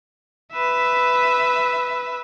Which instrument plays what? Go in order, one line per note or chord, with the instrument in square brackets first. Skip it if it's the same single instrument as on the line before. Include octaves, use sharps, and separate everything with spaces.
[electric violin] B4 E5